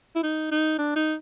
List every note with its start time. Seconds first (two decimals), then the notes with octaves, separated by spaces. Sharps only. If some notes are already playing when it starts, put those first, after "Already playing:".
0.15 E4
0.23 D#4
0.51 D#4
0.78 D4
0.96 D#4